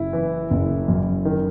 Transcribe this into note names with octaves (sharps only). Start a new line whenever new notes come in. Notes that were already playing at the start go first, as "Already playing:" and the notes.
Already playing: F#1 E4
E3
F#1
F#2
D#3